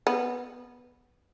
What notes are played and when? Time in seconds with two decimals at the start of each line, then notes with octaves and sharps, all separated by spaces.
0.07 B3